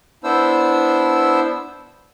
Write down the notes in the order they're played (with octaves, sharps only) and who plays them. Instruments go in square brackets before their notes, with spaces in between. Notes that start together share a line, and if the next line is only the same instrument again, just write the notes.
[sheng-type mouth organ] B3 D4 E4 C5 E6